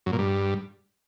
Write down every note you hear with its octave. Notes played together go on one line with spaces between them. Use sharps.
F#2
A#2
G2